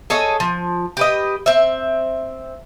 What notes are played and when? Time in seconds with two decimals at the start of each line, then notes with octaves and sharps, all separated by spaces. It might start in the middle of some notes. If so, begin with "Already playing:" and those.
0.10 G#4 A4 C#5 D#5
0.40 F3
0.97 G4 B4 D#5
1.46 C4 E5